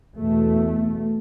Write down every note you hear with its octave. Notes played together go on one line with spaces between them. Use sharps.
E2 B2 A3